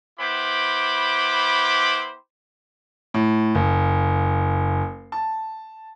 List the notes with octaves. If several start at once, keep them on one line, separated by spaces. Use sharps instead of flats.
B3 E4 C5 G5 B5 D6
A2
F#1
A5